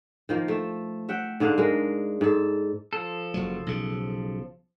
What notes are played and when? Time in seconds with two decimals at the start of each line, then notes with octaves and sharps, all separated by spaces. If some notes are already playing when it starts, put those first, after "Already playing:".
0.29 D#3 F3 A#3
0.48 A3 A4
1.09 E5 F#5 G5
1.40 G#2 D3 D4 F5
1.58 G#3 A#4
2.21 G#2 A4
2.93 F3 A4
3.34 F#1 F#3
3.66 B1 C#3